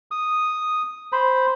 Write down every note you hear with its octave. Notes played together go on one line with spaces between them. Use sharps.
D#6
C5 B5